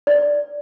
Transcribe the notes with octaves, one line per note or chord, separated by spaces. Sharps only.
D5